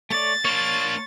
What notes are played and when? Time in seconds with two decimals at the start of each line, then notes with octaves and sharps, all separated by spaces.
0.10 A3 C#5 D5 A6
0.45 A#3 D4 C#5 C6